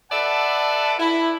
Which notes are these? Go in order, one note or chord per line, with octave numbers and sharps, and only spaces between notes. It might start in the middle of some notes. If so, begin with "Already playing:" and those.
A4 B4 D5 E5 F#5 A5
E4